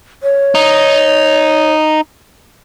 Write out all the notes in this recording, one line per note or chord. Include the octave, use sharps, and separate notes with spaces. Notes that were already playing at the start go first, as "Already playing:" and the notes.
C#5
D#4